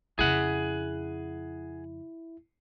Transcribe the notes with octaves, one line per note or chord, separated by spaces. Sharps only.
F2 C#3 E4 G#4 F#5